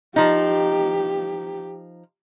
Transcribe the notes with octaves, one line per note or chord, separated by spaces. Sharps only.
F3 D#4 G4